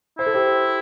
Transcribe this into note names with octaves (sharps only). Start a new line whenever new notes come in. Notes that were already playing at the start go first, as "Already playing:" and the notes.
E4 C5
A4
G4 C5